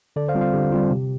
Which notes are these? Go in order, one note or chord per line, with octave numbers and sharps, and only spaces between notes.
D3 A4 D5
C5 F5
G3 C4 F4
C5 F5
D3 G4
G3 C4 F4
C3